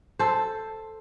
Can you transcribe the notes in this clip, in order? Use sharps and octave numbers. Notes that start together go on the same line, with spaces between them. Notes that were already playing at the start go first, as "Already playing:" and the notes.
A4 C5